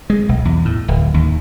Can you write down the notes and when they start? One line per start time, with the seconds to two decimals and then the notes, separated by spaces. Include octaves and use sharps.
0.10 G#3
0.29 B1
0.45 E2
0.65 A2
0.88 D1
1.14 D#2